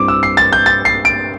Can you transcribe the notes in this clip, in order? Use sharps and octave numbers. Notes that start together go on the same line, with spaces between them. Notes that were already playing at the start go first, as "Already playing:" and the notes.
Already playing: G2 G3 C4 E4 D6
E6
C7
A6
G6
A6
C7
D7